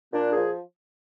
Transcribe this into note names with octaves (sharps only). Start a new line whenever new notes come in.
A#2 D4
G#4
F3